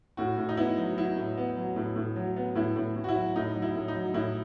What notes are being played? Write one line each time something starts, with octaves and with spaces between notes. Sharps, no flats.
A2 F#4
A2
D#4
B3 E4
F#3
F#3 E4
A2
B3
F#3
A2
A2
F#3
B3
A2 E4
A2
A2
F#4
E4
F#3
A2 D#4
F#3
E4
A2
D#4
F#3
A2 E4